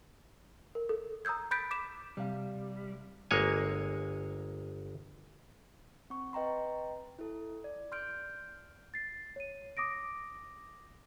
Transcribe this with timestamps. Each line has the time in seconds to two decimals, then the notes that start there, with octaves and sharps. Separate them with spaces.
0.75 A#4
0.89 A4
1.25 A#5 D#6 E6 G6 G#6
1.51 B5 F#6 G6 A6 B6 D7
1.71 D6 B6 E7
2.17 C3 G3 F5
3.31 G1 G#3 A#3 C#5 G#5
6.10 C4 C#6
6.33 B4 D#5 G5 A#5 C6
7.19 E4 A4
7.64 D5
7.92 C6 F6 G6 D7
8.94 A6 C7
9.36 C#5 D#7
9.77 D6 D#6 A#6 D7